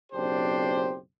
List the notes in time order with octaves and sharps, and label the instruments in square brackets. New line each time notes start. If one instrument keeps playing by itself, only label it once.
[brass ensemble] F#1 B1 C4 D4 G4 C5